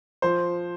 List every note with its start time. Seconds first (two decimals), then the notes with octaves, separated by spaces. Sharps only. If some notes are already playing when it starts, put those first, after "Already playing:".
0.22 F3 C5